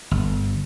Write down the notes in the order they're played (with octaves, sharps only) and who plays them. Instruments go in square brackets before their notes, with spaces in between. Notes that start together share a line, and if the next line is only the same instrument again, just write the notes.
[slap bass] G1